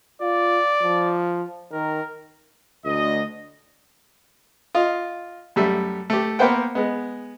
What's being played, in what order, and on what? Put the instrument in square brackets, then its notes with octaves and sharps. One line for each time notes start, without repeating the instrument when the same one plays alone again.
[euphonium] F4 [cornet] D5
[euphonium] F3
[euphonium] D#3 [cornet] A#4
[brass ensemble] D2 D#5
[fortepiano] F4 D#5 F5
F#2 G3 A3 E5
A3 G4
A#3 B3 B4 C5 F#5 G5
G#3 B3